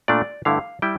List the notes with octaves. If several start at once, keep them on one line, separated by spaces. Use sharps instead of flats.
A#2 A3 D4 D5
G2 D3 A3 E4 F5
G3 E4 G5